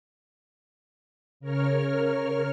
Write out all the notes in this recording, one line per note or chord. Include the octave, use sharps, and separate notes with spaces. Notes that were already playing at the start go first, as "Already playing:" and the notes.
C#3 A#4 C#5 F6